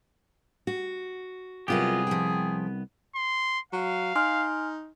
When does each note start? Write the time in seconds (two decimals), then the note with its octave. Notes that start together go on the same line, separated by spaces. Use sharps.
0.67 F#4
1.68 C2 F#3 B3 F4 G4 G#4 A#4
2.07 F3 G5
3.15 C6
3.73 F#3 F5
4.16 D#4 G#5 C6 F6